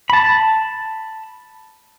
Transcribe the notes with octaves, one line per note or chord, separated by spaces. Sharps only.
A5 B5